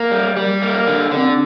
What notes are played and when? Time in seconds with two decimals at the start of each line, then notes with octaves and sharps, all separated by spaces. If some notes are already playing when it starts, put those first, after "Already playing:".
Already playing: A#3
0.11 G3
0.36 G3 G4
0.62 A#3
0.87 D3
1.11 D3
1.17 C4
1.27 D4